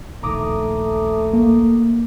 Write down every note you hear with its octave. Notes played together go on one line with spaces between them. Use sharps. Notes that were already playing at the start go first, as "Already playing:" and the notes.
D#1 A#1 D#3 A3 A#5 D6 D#6
A#3